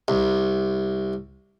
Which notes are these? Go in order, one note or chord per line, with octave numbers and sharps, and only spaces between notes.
C2